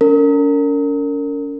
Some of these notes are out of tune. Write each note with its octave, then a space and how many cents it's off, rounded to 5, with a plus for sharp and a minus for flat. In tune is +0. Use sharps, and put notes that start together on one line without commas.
C#4 +40 A#4 -30